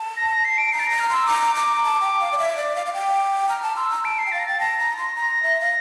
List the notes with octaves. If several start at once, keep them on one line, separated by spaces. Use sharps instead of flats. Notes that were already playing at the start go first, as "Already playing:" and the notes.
Already playing: A5
A#6
A#6
C7
D7
A#5 C7
A6
A#5 A#6
F6
C6 E6
A#5 D6
A#5
A5
G5
F5
D5
E5 D6
D5
F5
F5
G5
A#5 F6
A5
C6 E6
A#5
A5 D7
C7
G5
F5 A6
A#6
G5 A6
A5 A#6
A#5
C6
A#5
E5
F5